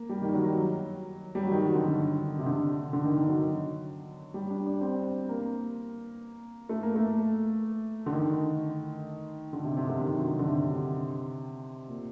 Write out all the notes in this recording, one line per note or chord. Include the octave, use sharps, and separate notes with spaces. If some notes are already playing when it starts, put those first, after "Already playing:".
Already playing: A#3
G3
D#3
F#3
F#3
G3
F#3
D#3
F#3
D3
D3
C3
D3
D3
D#3
D#3
F#3
G3
D4
D4
C4
A#3
A3
A#3
A3
D3
D#3
D3
C3
C3
D3
D#3
F#3
D3
C3
A#2